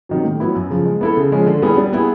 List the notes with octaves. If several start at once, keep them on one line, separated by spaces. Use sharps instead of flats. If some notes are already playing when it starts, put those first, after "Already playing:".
C3 D#3 F#3
A2
F#3 B3 E4
F#2
C#3 F3
G#3
B3 E4 A4
C#3
F3 G#3 C#4
D3
G3 B3 E4 G#4
G3
B3 E4 G#4